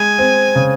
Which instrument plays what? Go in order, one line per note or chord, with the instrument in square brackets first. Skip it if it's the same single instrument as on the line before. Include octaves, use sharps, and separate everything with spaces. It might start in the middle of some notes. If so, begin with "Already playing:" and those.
Already playing: [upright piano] G#3 [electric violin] G#5
[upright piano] C4
C#3